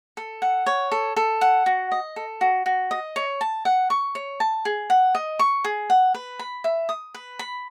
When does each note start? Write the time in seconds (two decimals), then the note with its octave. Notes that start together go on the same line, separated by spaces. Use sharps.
0.17 A4
0.42 F#5
0.66 C#5
0.92 A4
1.16 A4
1.41 F#5
1.66 F#4
1.92 D#5
2.16 A4
2.41 F#4
2.66 F#4
2.91 D#5
3.16 C#5
3.41 A5
3.65 F#5
3.90 C#6
4.15 C#5
4.40 A5
4.65 G#4
4.90 F#5
5.15 D#5
5.39 C#6
5.64 G#4
5.90 F#5
6.14 B4
6.39 B5
6.64 E5
6.89 D#6
7.14 B4
7.39 B5